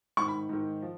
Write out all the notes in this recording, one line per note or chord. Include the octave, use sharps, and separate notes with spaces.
G#2 D#3 C#6
B5
G#2 D#3
F3